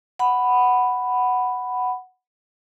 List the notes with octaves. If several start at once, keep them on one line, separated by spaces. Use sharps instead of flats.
F#5 B5